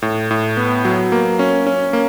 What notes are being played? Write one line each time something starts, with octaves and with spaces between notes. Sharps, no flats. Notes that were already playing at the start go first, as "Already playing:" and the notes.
A2
A2
B3
F#3
A#3
C#4
C#4
A#3